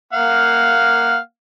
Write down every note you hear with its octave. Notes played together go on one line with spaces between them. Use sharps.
A#3 F5 F#5